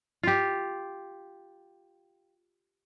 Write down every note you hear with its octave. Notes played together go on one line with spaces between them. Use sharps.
F4 G4